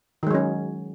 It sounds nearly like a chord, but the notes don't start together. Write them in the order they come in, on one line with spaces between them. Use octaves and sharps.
D#3 G#3 F#3 C#4